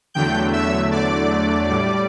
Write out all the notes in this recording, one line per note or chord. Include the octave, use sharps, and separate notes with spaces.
E2 D3 F#3 A3 G5 G6
E5 E6
D5 D6
A2 G3